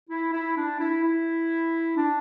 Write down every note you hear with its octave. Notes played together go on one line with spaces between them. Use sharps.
E4
E4
D4
E4
E4
D4